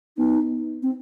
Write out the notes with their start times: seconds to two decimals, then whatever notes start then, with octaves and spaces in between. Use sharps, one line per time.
0.18 B3 D#4
0.83 C4